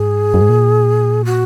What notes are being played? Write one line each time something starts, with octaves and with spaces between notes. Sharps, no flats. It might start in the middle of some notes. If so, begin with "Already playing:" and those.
Already playing: G#2 G#4
F#2
G#2
A#2
F#4